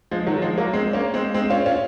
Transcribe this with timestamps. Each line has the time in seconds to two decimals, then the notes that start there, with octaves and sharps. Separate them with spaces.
0.11 F3 G#3
0.27 D#3 F#3
0.42 F3 G#3
0.58 F#3 A#3
0.73 G#3 C4
0.93 A#3 C#4
1.14 G#3 C4
1.34 G#3 C4
1.50 C#4 F4
1.66 C#4 F4